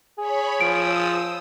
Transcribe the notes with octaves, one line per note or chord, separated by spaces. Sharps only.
G#4 C#5 B5
F3 D#6 E6 D7